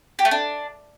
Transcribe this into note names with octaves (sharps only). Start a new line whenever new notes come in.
G4
A3
D4